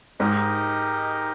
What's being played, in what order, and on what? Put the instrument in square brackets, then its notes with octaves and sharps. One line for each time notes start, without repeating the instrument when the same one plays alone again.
[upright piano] G#2 [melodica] D#4 G4 A#4 D#5